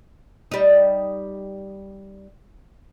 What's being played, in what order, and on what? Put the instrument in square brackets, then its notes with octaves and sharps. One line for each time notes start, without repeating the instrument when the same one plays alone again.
[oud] G3 D#4